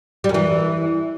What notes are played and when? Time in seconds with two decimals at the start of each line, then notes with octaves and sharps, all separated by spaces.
0.24 G3
0.29 F#2
0.34 E3